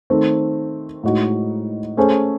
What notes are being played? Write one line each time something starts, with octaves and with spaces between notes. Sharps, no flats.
D#3 A3 C4
A2 G#3 D#4 F#4
A3 C#4 G#4 C5